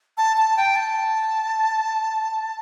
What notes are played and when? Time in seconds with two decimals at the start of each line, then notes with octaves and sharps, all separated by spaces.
0.18 A5
0.37 A5
0.57 G5
0.76 A5